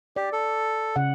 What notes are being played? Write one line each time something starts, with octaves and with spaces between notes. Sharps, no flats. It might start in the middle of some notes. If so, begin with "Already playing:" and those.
G4 D5
A4
C#3 F#5